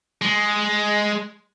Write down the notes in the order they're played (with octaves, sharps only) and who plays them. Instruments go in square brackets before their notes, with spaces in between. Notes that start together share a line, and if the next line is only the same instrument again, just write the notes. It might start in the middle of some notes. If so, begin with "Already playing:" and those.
[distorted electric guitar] G#3